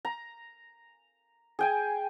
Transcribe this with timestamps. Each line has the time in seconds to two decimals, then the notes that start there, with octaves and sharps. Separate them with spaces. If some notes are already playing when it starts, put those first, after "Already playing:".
0.05 A#5
1.59 G#4 G5 G#5